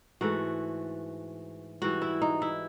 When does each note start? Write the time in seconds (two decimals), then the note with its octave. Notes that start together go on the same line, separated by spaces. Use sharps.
0.21 G#2 E3 A3 F#4
1.82 G#2 E3 G3 F#4
2.02 E4
2.22 D#4
2.42 E4